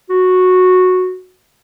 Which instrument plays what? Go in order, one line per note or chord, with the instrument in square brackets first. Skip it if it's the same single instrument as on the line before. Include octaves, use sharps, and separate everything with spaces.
[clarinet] F#4